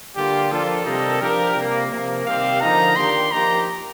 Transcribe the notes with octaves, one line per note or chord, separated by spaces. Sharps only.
D3 G3 A#3 F4 G4
F3 A#3 D4 F4 A4
C3 D#3 G3 A#3 D#4
F3 A#3 D4 G4 A#4
C3 G3 A#3
C3 F3 A#3
C3 D#3 G3 C4 G4 F5
D3 F3 A#3 D#4 A#5
D#3 A#3 D4 G4 C6
F3 A#3 D#4 G4 A#5